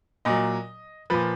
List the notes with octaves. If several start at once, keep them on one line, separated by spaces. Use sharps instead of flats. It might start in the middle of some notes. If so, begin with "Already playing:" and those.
A#2 F#3 D#5
A#2 F3 B4